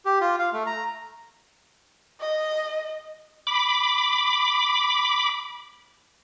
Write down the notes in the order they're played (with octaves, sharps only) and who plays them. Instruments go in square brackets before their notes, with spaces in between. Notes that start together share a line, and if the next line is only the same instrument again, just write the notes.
[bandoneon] G4
F4
F5
A3
A#5
[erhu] D#5
[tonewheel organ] B5 D6